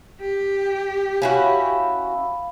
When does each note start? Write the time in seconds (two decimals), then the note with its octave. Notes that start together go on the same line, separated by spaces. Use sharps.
0.21 G4
1.22 C#4 E4 F#4 F5 B5